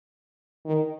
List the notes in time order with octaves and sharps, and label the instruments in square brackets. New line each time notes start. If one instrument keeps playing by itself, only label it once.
[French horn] D#3